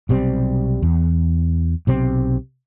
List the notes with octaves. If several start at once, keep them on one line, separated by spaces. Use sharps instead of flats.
B1 C3 G3 C4
E2
B1 C3 C4